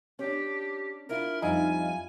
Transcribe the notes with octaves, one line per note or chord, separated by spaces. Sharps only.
C#4 D4 G4
D4 E4 F4 A#4
F2 G3 D#4 F5 G#5